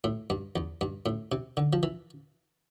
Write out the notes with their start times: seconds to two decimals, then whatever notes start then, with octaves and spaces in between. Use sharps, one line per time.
0.04 A2
0.30 G2
0.56 E2
0.81 G2
1.06 A2
1.32 C3
1.57 D3
1.73 F3
1.83 E3